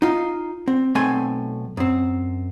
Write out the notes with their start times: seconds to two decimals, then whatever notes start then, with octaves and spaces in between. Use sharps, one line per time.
0.02 D#4 F4
0.68 C4
0.95 B1 A3 C4 G#5 C6
1.77 F#2 C4